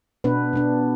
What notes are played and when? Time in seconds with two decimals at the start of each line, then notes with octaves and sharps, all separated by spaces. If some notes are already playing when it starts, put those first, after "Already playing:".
0.24 B2 B3 D4 B4
0.53 B2 B3 D4